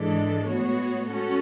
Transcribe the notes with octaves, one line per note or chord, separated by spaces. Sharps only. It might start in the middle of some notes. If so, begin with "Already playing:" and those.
Already playing: G#2 E3 G#3 D4 A4
A2 G#3 B3 F#4 C#5
C#4 F#4 A4